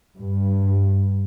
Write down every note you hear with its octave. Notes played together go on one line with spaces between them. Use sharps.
G2